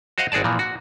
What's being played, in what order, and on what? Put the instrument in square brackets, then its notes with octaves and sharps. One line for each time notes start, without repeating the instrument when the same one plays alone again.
[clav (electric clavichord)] F#4 C5 D#5 F5 F#5
G#1 F#4 G#4 D5 A5
A#2 E3 F3
F#4